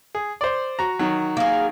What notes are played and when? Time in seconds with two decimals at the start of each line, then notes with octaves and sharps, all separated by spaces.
0.15 G#4
0.41 C5 D5
0.79 F#4 A#5
0.99 D#3 F#3
1.37 A#3 G#4